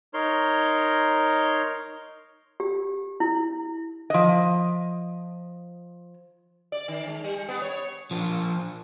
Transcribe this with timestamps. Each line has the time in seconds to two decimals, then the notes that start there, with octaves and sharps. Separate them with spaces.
0.14 D#4 A#4 C#5 C6
2.60 G4
3.20 E4
4.10 F3 D#5
6.72 D5
6.88 D#3
7.07 G#3
7.24 G3
7.48 B3
7.62 C#5
8.11 F3 D4